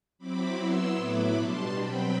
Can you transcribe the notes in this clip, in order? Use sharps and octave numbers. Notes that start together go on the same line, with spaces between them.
F#3 C4 E4 B5 D6
F#3 B3 E4 C6 E6
A2 F#3 B3 E4 B5 D6
B2 G3 D4 A5 C6
B2 F#3 C4 G5 B5